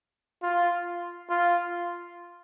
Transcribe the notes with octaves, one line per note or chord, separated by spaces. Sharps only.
F4
F4